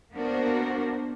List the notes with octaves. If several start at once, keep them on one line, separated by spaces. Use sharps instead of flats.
A#3 B3 D4 F#4 A#4 C5